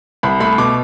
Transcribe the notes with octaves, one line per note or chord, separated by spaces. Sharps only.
C2 B5
A3 B5
B2 D6